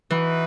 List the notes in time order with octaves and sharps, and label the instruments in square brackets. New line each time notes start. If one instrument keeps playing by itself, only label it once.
[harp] E3 [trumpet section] D#4 F#4 B4